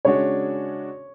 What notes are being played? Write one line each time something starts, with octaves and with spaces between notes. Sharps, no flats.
C#3 G#3 D4 F#4 C#5